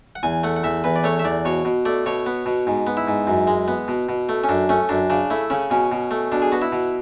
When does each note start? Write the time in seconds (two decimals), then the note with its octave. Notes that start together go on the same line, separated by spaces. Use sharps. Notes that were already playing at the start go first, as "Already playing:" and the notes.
0.15 F#5
0.23 E2 G#5
0.43 A3 F#5
0.56 F#5
0.63 E2 E5
0.84 E2 B4
0.96 D5
1.04 A3 C#5
1.19 E5
1.25 E2 D5
1.45 B2 C#5
1.65 B2
1.85 A3 D5
2.06 B2 C#5
2.26 B3
2.46 B2
2.67 G#2
2.87 B3
2.97 E4
3.08 G#2
3.27 F#2
3.47 G#3
3.68 B3
3.88 B2
4.09 B2
4.29 A3
4.44 C#4
4.49 F#2 D4
4.69 A3 C#4
4.89 F#2 D4
5.10 C#3 D4
5.30 A3 E4
5.50 C#3 C#4
5.70 B2 C#4
5.92 B2
6.11 A3
6.32 B2 D4
6.42 G#4
6.52 B3 F#4
6.62 E4
6.72 B2